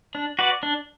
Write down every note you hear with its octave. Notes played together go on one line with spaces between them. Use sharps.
D4
F#4 B4 D5
D4